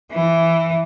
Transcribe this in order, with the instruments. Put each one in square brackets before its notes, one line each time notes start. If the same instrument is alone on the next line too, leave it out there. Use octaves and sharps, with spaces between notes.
[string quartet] E3